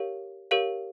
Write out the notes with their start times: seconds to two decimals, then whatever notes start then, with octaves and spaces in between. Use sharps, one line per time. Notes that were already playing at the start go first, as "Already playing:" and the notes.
Already playing: G4 A#4 C#5 F5
0.51 G4 A#4 C#5 F5